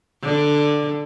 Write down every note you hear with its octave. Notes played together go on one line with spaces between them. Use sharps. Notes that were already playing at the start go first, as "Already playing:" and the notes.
D3